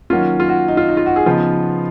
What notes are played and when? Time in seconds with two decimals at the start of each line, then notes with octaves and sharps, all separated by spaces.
0.10 D#3 F#3 A#3 C#4 F4
0.40 F4
0.49 F#4
0.68 D#4
0.77 F4
0.88 D#4
0.97 F4
1.06 F#4
1.16 G#4
1.26 C#3 F3 B3 D#4 F4